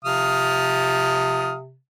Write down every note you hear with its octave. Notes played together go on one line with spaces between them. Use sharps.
C3 F3 F5 D#6